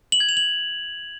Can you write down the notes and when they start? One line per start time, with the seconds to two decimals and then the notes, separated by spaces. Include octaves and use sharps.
0.12 F#7
0.20 G#6
0.29 F7
0.37 F#7